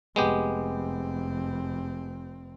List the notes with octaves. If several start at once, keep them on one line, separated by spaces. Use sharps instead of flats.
F1 G#3 B3 C4 G4